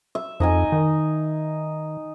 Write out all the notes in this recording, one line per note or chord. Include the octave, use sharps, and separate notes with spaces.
E5
F2 D#4 D#5 G#5
D#3